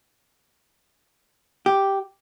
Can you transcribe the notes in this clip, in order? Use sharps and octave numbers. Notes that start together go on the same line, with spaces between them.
G4